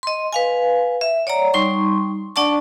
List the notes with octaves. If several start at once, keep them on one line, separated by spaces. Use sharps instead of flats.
D#5 C6
B4 F5 G#5
E5
C#5 D5 F#5 A#5
G3 D#4 C6 C#6
D4 D5 F#5 A5 C#6